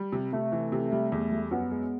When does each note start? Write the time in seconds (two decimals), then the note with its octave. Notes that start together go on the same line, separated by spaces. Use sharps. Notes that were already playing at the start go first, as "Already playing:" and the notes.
Already playing: G3
0.12 C3
0.32 C3 A3
0.52 E3
0.72 C3
0.92 G3
1.12 E2
1.32 G3
1.51 F#2 B3
1.72 G#3